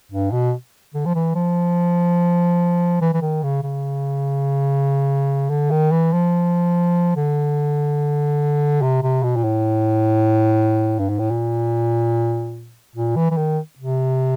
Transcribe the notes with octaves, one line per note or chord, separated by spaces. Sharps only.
G2
B2
D3
F3
E3
F3
E3
E3
D#3
C#3
C#3
D3
D#3
E3
F3
D3
C3
C3
B2
A#2
A2
G2
G#2
A2
A#2
A#2
E3
E3
D#3
C3